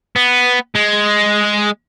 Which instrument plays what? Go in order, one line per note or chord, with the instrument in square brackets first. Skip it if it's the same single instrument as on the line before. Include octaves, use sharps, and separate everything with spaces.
[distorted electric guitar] B3
G#3